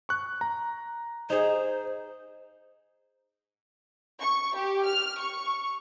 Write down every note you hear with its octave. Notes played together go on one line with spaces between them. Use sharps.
C#6 F#6
A#5
D#4 G#4 C5
C#6
G4
F6
C#6